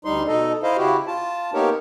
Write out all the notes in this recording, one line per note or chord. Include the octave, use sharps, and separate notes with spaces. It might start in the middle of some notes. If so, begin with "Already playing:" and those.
D2 G3 D#4 C6
B2 D#4 A4 D#5
E4 C5 D#5 F5
C#3 E4 F#4 G4
F4 A5
A#3 B3 D#4 G4 A#4 C#5